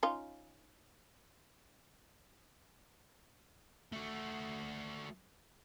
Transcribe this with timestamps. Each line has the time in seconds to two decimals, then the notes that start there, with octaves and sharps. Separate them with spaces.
0.03 C#4 D#4 F4
3.92 A3 F#4